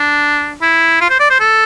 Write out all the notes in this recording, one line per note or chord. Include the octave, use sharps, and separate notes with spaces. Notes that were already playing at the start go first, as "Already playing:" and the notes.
Already playing: D4
E4
F4
C5
D5
C5
A4